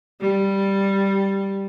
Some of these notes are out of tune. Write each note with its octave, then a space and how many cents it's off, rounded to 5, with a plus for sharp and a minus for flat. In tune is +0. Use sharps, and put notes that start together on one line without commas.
G3 +0